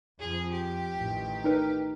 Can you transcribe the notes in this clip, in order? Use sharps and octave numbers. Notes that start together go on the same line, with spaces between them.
F2 F3 G#4
G4
A1 D#3
D#4 A#4 B4